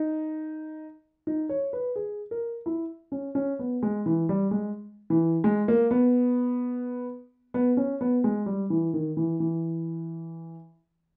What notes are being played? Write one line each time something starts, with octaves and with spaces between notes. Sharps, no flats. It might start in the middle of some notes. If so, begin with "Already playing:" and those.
Already playing: D#4
D#4
C#5
B4
G#4
A#4
E4
C#4
C#4
B3
G#3
E3
G3
G#3
E3
G#3
A#3
B3
B3
C#4
B3
G#3
G3
E3
D#3
E3
E3